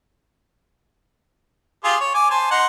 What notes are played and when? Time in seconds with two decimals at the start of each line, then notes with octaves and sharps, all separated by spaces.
1.84 F4 G4 G#4
2.00 C#5
2.14 G#5 D6
2.31 C5 G#5 A5
2.51 D#4 F#5 C6